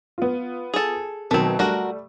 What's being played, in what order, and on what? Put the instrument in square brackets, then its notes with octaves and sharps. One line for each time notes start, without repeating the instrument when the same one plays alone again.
[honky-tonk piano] B3 F4
[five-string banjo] G#4 A4
[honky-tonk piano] B2 D#3 F#3 [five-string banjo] A3 C4
[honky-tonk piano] G3 A3 [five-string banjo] D4 F#4 A#4